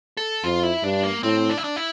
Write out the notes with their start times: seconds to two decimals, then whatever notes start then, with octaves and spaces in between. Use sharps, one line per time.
0.17 A4
0.44 F2 F4
0.63 E4
0.84 G2 D4
1.03 A#3
1.23 A2 C4
1.49 D4
1.57 E4
1.64 D4
1.76 E4